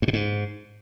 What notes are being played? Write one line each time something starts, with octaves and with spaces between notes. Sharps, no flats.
G2
B2
G#2